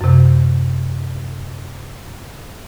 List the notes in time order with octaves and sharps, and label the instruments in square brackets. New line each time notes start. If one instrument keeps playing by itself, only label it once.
[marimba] F#2 C3